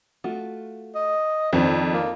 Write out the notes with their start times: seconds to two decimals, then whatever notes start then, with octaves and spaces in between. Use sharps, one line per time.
0.24 A3 F4 F#4
0.95 D#5
1.53 F2 D#3 C4 D4
1.94 A#3